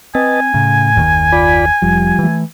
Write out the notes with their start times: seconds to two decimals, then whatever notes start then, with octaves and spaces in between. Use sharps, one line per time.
0.15 C4 B4 D#5 G#5 A5
0.54 A2 C#3
0.96 F#1 D#2 D#3
1.32 F4 D5 B5
1.82 F1 F3 G3
2.19 E3 A3